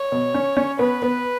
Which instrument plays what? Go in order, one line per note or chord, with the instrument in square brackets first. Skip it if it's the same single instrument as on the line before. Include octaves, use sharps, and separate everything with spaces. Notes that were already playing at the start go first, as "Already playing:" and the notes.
Already playing: [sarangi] C#5
[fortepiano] B2
C#4
C#4
[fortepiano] B3 [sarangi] B4
[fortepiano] B3